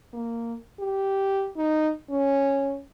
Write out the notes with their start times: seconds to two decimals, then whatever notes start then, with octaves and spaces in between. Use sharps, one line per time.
0.13 A#3
0.80 G4
1.56 D#4
2.10 C#4